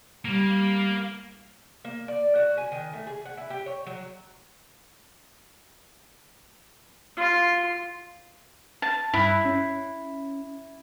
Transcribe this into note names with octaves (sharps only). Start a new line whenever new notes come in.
G3 A#3
A#3
D5
F#4
G#5
D#3
A3
G#4
F#5
E4
G4
C#5
F#3
F4 C6
A5
G2 E4 E6 F#6
C#4